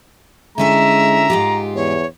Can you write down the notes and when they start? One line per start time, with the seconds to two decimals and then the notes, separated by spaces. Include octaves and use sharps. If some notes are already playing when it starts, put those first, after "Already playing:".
0.58 D3 G#3 C#4 E4 E5 A#5
1.30 G#2 F4 G4
1.75 E2 C#5